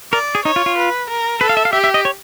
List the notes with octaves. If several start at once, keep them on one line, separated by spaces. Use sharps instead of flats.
A#4 D5
G#4
D#4 C#5
F4
F4
B4
A#4
A4 B4
F5
E5
F5
G4 E5
E5
D#5
C#5